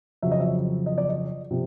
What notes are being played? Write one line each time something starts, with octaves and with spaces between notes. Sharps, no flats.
F2 C#3 F#3 E5
D#5
E5
D#5
D5
D#5
C3 F3